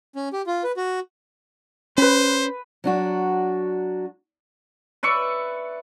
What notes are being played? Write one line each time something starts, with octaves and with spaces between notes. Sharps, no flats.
C#4
G4
F4
B4
F#4
C#4 B4 C5 B5
F#3 D4 F#4
B4 D5 E5 C#6